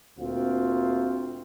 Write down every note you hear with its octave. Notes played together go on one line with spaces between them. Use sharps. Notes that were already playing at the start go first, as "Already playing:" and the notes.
D2 A#2 C4 F4 F#4